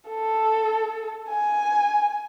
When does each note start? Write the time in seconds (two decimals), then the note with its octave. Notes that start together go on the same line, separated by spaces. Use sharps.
0.10 A4
1.29 G#5